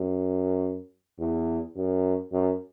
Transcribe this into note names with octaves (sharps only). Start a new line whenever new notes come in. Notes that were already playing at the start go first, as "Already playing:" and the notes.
Already playing: F#2
E2
F#2
F#2